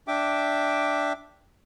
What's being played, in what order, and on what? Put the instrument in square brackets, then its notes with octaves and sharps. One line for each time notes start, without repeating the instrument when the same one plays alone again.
[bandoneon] D4 E5 G5 D6